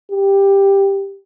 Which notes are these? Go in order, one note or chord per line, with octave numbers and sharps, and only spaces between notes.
G4